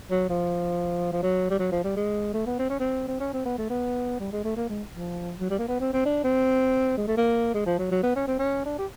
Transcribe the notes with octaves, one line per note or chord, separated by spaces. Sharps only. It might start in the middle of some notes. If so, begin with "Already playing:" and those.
F#3
F3
F3
F#3
G3
F#3
F3
G3
G#3
A3
B3
C4
C#4
C4
C4
C#4
C4
B3
A3
B3
G3
G#3
A3
A#3
G#3
F3
F#3
G3
A#3
B3
C4
C4
D4
C4
G#3
A3
A#3
G#3
F3
F#3
F#3
B3
C#4
C4
C#4
D4
G4